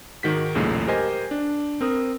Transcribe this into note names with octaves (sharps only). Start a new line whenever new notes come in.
G#2 D#3 F#4 B6
B1 E2 A#2 C#3 G#3 A3
G4 A#4 C5 D#5 G#5
D4
C4 A#4 D#6